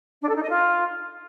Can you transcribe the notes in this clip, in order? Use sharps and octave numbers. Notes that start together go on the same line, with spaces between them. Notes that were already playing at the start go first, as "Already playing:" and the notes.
D4
A4
D#4
D#5
F4